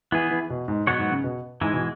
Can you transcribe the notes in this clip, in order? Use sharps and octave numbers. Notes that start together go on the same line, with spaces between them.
E3 B3 E4 G#4
E3
B2
G#2
B2 F#3 B3 F#4 C#5
G#2
C#3
B2
G#2 E3 G#3 E4
B2